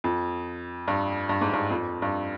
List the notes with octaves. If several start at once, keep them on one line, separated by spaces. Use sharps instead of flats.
F2
G2
G2
G#2
G2
F2
G2